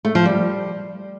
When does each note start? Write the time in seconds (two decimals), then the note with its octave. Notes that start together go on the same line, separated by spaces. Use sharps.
0.05 A3
0.15 F3
0.25 G3